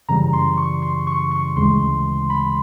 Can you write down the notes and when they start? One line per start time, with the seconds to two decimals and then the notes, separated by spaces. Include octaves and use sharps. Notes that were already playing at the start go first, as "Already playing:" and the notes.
0.09 F#2 C#3 E3 G3 A#5
0.33 C6
0.58 C#6
0.82 C6
1.07 C#6
1.31 C#6
1.56 D2 C#3 E3 G#3 C6
2.30 B5